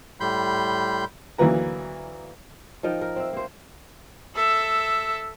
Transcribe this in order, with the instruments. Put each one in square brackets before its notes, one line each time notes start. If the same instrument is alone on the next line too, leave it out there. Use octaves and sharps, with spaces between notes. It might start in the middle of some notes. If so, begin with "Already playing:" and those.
[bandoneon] A2 G3 B5 C6 G6
[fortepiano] D2 E3 F#3 A#3 B4 A#5
[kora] F3 D#4 A#4 G5
A#4
C4 E5
A#3 C5
[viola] A4 E5